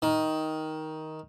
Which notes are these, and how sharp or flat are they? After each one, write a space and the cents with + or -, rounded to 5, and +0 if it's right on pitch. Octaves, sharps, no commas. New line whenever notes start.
D#3 +10